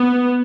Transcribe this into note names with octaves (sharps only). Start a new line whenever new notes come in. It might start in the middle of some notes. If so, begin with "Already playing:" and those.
Already playing: B3